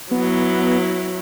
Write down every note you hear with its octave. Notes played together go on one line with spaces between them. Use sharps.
F#3 B3 E4